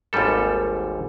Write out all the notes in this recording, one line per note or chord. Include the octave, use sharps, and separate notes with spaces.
G#1 D#2 G#2 G3 A4